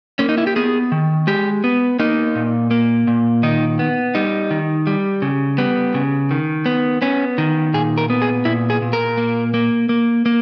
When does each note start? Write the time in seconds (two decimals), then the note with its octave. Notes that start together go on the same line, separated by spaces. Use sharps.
0.19 A#3 C#4
0.29 D#4
0.38 E4
0.47 G4
0.56 B3 G#4
0.92 D#3
1.27 G#3 G4
1.64 B3
1.99 A#3 D#4
2.35 A#2
2.71 A#3
3.07 A#2
3.43 D#3 D#4
3.79 B3
4.15 G3 D#4
4.51 D#3
4.87 G3
5.22 C#3
5.58 G3 B3
5.94 C#3
6.31 D#3
6.66 B3
7.02 B3 C#4
7.38 D#3
7.74 A#2 G#4
7.98 A#4
8.10 B3
8.22 G#4
8.45 A#2 E4
8.70 G#4
8.82 A#2
8.93 A#4
9.17 A#3
9.54 A#3
9.89 A#3
10.26 A#3